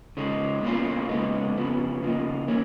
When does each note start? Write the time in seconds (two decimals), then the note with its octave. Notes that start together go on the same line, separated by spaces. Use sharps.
0.17 C#3 G#3 D#4
0.63 B2 A#3 C#4 F4
1.09 C#3 G#3 B3 D#4
1.55 F2 C#3 F3 B3
2.01 C#3 F3 A#3 D#4
2.47 D#3 A#3 C#4